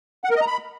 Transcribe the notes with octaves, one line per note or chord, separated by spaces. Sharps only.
F#5
A#4
D#5
A#5
B5